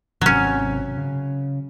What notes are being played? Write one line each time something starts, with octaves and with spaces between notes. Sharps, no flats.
G#1 C3 F#3 C#4
C#3